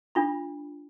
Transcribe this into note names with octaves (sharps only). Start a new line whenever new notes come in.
D4 F4 B5